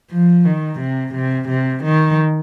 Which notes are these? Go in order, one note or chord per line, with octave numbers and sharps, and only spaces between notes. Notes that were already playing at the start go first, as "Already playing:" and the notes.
F3
D#3
C3
C3
C3
D#3